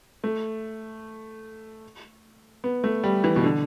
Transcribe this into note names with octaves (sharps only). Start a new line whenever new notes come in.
A3
B3
A3
G3
E3
B2
D3